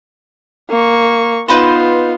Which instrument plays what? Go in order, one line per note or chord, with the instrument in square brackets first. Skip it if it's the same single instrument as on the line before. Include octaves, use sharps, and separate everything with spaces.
[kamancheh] A#3 C#6
[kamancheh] B3 F4 [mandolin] D#4 B4 C5